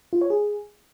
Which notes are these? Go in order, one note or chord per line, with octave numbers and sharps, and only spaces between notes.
F4
C#5
G#4